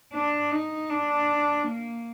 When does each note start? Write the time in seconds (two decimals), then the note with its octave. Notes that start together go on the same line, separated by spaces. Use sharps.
0.13 D4
0.52 D#4
0.90 D4
1.67 A#3